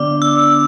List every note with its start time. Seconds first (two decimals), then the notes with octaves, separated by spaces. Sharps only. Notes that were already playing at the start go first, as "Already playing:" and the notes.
Already playing: D3 B3 D4 D5 D6
0.22 E6